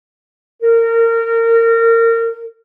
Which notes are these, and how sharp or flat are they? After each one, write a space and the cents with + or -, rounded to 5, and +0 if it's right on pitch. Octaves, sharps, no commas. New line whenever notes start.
A#4 -25